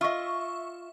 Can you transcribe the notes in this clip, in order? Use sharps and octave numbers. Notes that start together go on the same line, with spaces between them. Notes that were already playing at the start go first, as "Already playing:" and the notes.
F4 D#5 E5 C#6